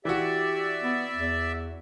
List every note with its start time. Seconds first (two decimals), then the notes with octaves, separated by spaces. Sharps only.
0.05 E3 F#4 G4 D5 E5
0.83 B3
1.16 E2